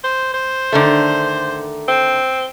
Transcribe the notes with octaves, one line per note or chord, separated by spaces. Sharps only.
C5
C5
D3 D#3 A3
C4